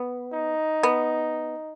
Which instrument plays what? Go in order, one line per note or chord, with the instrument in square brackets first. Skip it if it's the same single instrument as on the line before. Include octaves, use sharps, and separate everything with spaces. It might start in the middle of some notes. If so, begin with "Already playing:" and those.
Already playing: [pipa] B3
[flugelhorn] D#4
[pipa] B3